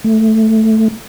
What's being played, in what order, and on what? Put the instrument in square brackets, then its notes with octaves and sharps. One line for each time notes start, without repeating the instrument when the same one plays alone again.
[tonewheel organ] A3